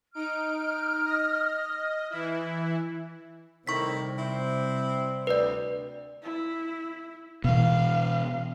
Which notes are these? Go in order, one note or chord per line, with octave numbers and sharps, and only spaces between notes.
D#4 F6 D7
D#5 A#6
E3 E4
A2 C3 D#3 G3 C4 E4 C#6 B6
C4 E4
D2 B4 D5
E4
B2 E3 F5